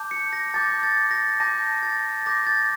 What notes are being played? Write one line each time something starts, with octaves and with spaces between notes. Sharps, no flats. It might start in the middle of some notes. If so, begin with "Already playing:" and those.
Already playing: A5 D6 G6
C#7
A#6
A5 D6 G6 A6
A6
A#6
A5 D6 G6 A#6
A6
A5 D6 G6 A#6
A6